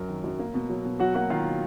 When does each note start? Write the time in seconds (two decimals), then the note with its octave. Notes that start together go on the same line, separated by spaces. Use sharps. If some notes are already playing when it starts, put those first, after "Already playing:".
Already playing: F#2 F#3 A#4
0.08 D#3
0.24 F#2
0.39 A#3
0.54 B2
0.70 F#3
0.85 B2
1.00 F#3 F#4 F#5
1.15 A#3 F#4 F#5
1.30 D#3 F4 F5